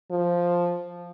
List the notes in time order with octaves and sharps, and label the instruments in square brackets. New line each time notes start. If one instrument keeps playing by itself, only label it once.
[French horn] F3